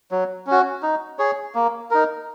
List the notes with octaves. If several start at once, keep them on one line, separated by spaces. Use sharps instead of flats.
F#3
C#4 F#4
D#4
G#4 C#5
A#3
D#4 A#4